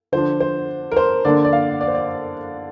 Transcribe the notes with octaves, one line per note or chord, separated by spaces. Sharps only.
D3 F3 D4 C5
C5
A#4
C5
D3 A#3 D4 D5
D5
F5
D5
C5
D5